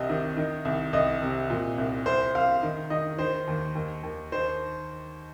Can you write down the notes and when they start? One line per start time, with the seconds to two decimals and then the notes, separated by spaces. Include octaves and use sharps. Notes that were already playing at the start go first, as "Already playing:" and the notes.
Already playing: C2 C3 D#5
0.09 D#3
0.37 D#3
0.65 C2
0.93 C2 D#5
1.22 C3
1.50 A#2
1.78 C2
2.06 C2 C5
2.35 C2 F5
2.63 D#3
2.90 D#3 D#5
3.19 D#3 C5
3.47 D#2
3.75 D#2
4.03 D#2
4.32 D#3 C5